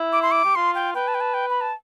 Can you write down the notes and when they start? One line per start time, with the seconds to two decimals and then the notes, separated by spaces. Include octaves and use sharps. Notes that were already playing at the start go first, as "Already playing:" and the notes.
Already playing: E4
0.13 D6
0.22 C6
0.31 D6
0.45 G4
0.55 F4 C6
0.75 G5
0.94 B4 G5
1.08 A5
1.15 G5
1.21 A5
1.34 G5
1.50 B5
1.61 A5